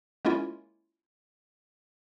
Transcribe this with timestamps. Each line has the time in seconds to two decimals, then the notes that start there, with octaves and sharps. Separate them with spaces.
0.25 G#3 A#3 C#4 E4 F4